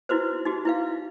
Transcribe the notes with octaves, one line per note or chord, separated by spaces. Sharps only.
D#4 E4 F#4 B4 C5
D#4 F#4 G4
E4 B4 F5